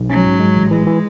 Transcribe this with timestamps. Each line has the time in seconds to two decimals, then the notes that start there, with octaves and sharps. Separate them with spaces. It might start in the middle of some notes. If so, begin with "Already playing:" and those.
Already playing: B1
0.09 F#3 C#4
0.24 G#2
0.40 G#3
0.56 A1
0.71 E3 G#3
0.87 E3